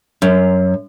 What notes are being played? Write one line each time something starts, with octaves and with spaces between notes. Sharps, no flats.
F#2